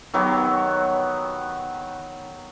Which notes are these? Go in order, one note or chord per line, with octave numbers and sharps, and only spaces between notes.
D#3 F#3 B3 G4